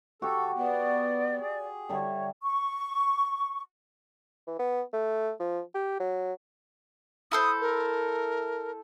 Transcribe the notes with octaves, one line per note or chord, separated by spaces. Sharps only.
F#4 G4 A4 C#6
B3 D5
G#4
D3 G3 C#5 E5
C#6
E3
B3
A3
F3
G4
F#3
E4 A4 C5 D#6
A#4